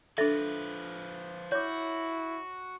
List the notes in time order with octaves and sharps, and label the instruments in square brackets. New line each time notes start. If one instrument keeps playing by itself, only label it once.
[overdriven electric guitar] F3 B4 [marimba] D4 A4 [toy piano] E5
[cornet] E4 [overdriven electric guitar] F#4 [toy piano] C#5 D6